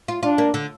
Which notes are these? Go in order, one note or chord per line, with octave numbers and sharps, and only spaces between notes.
F4
D4 F4
A#3
D3